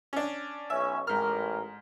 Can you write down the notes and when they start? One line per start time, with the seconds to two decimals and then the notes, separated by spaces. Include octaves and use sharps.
0.13 C#4 D4
0.70 B1 C#4 E5
1.07 A1 G#2 A#4 F6